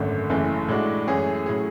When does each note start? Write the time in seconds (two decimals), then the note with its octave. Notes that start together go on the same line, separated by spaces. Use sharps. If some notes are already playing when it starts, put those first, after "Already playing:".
Already playing: G#1 F#2 D3 A3
0.29 F#1 F#2 C#3 E3 A3
0.68 A2 G#3 D4 F#4
1.07 F#2 E3 A3 C#4 G#4
1.46 A2 F#3 C#4 G#4